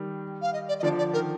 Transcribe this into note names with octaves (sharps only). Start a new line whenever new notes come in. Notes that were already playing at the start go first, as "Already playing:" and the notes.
Already playing: D#3 G3
F5
D#5
D5
D#5
D3 F3 D5
D5
D#3 A#4